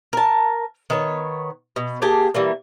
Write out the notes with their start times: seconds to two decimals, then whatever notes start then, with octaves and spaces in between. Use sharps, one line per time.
0.13 A#4 A5
0.90 D#3 B3 C#5
1.76 B2
2.02 A#3 G4 G#4 A5
2.34 E3 G3 A#3